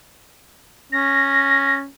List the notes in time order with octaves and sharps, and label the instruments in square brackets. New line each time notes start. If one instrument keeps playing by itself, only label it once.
[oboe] C#4 [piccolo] A#6